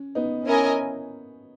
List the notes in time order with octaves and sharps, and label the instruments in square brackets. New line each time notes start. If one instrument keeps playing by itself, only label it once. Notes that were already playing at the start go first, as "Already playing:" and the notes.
Already playing: [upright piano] C#4
B3 D#4
[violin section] C#4 E4 A#4 D#5 G#5